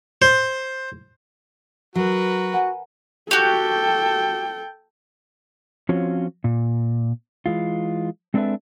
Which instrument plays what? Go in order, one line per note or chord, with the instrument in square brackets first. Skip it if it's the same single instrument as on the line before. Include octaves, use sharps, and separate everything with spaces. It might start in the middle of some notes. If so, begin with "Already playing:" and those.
[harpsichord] C5
[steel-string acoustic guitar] F#3 [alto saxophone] F#4 [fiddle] A#4 B4
[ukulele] F#5 G#5
[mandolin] F#4 G4 [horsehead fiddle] A4 G5
[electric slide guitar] F3 C4 C#4 F4 F#4 C#5
A#2
E3 G#3 F4
G#3 C4 D4 A4 B4 E5